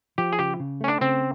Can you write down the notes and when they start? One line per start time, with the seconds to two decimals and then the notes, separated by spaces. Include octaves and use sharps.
0.18 F3 G4
0.32 G#4
0.39 C#3 G4
0.60 C#3
0.81 A3 C#4
0.88 D4
1.01 C#3 C4